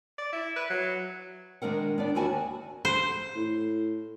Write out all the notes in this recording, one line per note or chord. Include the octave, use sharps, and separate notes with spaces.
D5
E4
B4
F#3
D#3 G#3 D4 A#4 F#5
B3 D4 D5
D#2 E4 F#4 G#5 A5
C5
A2